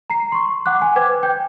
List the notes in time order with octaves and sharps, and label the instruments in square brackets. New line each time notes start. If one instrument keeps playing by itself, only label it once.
[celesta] A#5 C7
C6 C#6
F#5 D6 F#6
G#5
B4 C5 G5 D6 G#6
G5 G6